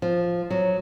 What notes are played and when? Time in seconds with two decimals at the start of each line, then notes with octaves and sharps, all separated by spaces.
0.02 F3
0.50 F#3